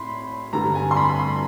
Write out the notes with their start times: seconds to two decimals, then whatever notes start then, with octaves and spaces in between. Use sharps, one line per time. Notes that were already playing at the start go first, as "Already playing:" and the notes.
Already playing: A2 B5 C6
0.53 G2 D3 G3 A#5
0.75 G#5
0.91 C6
0.97 B5
1.19 C6